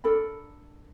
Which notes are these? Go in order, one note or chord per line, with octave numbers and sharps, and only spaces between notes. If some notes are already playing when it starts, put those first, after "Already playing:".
D4 A4 A#4 B5